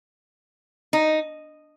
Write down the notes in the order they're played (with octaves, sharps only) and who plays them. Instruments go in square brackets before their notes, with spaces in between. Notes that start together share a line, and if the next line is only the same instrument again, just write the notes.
[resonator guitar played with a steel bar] D#4